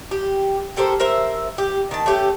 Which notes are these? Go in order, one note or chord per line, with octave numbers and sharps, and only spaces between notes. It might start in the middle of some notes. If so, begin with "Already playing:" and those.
G4
G4 A4 A#4 C5
A#4 C5 E5
G4
D#3 A5
A3 C#4 G4